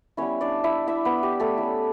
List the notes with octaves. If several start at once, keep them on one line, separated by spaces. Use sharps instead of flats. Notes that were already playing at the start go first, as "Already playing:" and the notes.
G3 B3 C#4 E4 C#5
D4 D5
E4 E5
E4 E5
B3 B4
G4
A3 A4
A3 C#4 E4